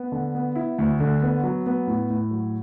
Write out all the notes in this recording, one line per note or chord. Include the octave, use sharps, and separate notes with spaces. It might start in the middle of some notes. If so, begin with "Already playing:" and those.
Already playing: B3
D3
B3
E4
D2
D3
B3
F#3
B3
A2
A2
F#3